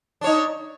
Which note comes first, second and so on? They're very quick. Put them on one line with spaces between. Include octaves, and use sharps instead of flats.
D4 C#5 D#4